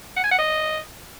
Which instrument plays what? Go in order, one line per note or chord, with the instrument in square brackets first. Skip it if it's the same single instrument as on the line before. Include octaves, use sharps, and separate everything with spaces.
[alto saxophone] F#5
G#5
F#5
D#5